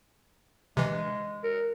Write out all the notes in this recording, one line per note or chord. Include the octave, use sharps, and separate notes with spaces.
C3 E3 G#3
A#4